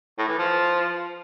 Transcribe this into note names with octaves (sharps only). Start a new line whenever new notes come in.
A2
E3
F3